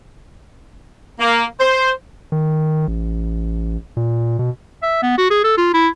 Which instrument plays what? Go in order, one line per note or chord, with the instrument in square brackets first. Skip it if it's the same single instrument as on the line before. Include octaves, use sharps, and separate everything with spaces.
[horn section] A#3
C5
[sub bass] D#3
A1
A#2
B2
[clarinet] E5
B3
F#4
G#4
A4
F4
E4